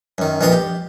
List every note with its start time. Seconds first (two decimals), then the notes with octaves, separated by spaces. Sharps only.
0.18 F#2 D#3
0.41 A#1 F2 B3 F4 A#4 D#6
0.52 G4